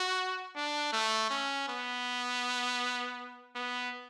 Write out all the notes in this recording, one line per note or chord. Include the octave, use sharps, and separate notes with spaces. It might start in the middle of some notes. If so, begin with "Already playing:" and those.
Already playing: F#4
D4
A3
C#4
B3
B3